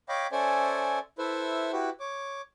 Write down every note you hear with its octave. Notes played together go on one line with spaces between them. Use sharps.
C#5 D#5 F5 G5 B5 D6
C#4 A4 C5 D5 E5 G#5
E4 A4 B4 C5 E5
E4 F#4 G4 B4
C#5 D6